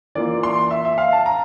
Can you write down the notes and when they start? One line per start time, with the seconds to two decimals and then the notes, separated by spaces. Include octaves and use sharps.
0.15 E3 A#3 F4 D5
0.43 C6
0.71 E5
0.85 E5
0.98 F5
1.13 A5
1.26 A#5